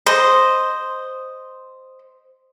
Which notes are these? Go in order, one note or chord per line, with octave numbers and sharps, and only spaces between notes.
C5 D#5